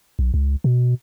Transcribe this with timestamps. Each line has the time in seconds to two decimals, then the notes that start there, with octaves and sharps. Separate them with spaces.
0.19 B1
0.34 C#2
0.64 B2